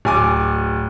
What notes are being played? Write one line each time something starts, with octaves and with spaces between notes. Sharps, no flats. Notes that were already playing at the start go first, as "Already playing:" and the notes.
D1 G#5 D6